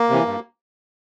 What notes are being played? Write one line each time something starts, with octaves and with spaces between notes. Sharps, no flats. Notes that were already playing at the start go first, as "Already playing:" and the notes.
Already playing: A#3
C3 E3
G2